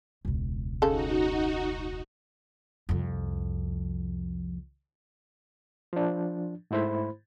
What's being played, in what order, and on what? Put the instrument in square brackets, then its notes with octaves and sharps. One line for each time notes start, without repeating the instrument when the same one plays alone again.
[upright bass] E1 C#2
[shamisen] C#3 A4 [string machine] D#4 F#4
[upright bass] C2 F2
[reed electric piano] F3 D4
G#2 A3 E4 C5 B5